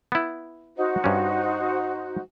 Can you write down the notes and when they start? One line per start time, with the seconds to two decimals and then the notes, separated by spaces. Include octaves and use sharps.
0.12 B3 E4
0.76 D#4 F#4 C5
1.04 G2 C#4